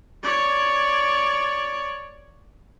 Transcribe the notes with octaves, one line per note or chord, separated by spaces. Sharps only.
C#5 D5